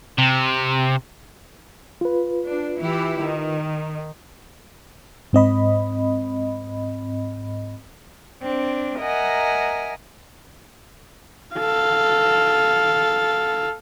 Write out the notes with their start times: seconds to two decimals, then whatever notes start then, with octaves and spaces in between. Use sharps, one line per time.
0.18 C3
2.01 F4 B4
2.46 D4
2.80 E3 E4 G4
3.18 D#3
5.33 G#2 C4 D#5 B5
8.41 C4 D4
8.99 A#4 D#5 E5 F#5 G#5 A#5
11.55 A4 F5